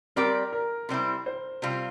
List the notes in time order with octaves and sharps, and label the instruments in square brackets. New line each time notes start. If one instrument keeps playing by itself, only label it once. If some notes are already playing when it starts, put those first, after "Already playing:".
[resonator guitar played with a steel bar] G3 C4 G4 D5 [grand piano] A#4
[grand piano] A#4
[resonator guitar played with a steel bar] C3 G3 C4 E4
[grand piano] C5
[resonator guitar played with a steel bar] C3 G3 C4 F4